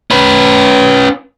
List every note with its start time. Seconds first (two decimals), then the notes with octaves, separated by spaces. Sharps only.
0.11 C#4 B4